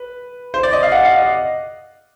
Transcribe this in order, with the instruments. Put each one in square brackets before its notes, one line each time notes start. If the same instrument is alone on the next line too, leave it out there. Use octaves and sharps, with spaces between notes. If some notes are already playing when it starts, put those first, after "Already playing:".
Already playing: [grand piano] B4
C5
D5
D#5
F5
F#5
F5
D#5